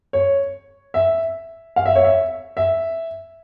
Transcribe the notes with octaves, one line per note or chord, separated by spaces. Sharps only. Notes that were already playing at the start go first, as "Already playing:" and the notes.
C#5
E5
F5
E5
C#5
E5
E5